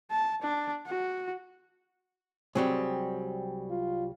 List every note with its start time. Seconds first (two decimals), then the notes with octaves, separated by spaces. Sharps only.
0.11 A5
0.42 D4
0.87 F#4
2.55 C2 F#3 G3 C4 G#4
3.70 F4